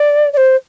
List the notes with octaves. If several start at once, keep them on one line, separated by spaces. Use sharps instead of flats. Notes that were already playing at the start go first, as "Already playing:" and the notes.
Already playing: D5
D5
C5